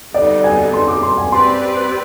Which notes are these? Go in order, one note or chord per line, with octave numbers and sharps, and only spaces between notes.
D3 G3 B3 D#4 D5
G#5
C6
D6
C6
G#5
C4 G4 B4 D5 C6